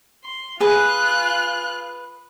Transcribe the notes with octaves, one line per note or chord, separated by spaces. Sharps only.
C6
F4 G#4 B4 F#6